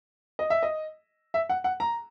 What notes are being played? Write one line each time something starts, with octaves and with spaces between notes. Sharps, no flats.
D#5
E5
D#5
E5
F#5
F#5
A#5